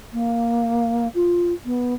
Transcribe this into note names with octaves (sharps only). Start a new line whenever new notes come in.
A#3
F4
B3